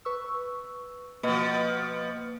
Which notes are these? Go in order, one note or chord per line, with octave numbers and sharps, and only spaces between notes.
B4 C#6 E6
B2 F3 A#3 B4 D#5